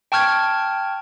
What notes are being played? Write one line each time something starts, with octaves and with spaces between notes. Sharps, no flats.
G5 A5 C#6 F6 G6 G#6